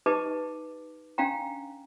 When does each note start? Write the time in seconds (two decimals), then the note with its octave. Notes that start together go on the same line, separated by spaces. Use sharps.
0.06 D#4 G4 B4 D#5 A5 D6
1.18 C#4 D4 F5 G5 A#5